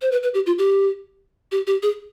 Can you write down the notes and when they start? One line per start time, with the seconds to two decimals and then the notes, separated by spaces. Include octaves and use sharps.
0.02 C5
0.12 B4
0.23 B4
0.34 G4
0.46 F4
0.58 G4
1.52 G4
1.67 G4
1.83 G#4